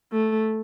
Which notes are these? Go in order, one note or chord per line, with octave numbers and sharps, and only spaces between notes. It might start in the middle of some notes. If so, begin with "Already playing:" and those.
A3